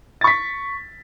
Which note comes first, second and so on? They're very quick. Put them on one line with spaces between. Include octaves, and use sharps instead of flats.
A6 C#6 B6